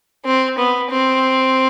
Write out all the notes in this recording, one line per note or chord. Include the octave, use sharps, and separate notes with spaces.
C4
B3
C4